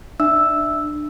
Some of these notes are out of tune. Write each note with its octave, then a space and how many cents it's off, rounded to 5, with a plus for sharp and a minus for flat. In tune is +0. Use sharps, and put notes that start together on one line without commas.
D4 +25 E5 +0 E6 +0